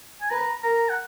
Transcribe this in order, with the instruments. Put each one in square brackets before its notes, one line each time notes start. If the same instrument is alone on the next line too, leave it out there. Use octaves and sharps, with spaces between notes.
[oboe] G#5
[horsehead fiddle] B4 [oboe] A#5
[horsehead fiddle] A#4 [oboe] A#5
[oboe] F#5